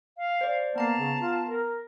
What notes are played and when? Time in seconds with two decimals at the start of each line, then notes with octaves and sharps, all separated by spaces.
0.18 F5
0.41 C5 D5
0.76 A#3 B3 A5 A#5 C7
0.98 C#3
1.19 F4
1.46 A#4